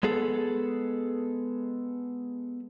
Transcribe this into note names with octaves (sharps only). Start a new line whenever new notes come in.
G#3 B3 G#4 A4